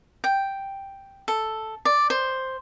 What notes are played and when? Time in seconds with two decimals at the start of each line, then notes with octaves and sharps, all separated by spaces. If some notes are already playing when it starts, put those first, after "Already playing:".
0.24 G5
1.28 A4
1.85 D5
2.10 C5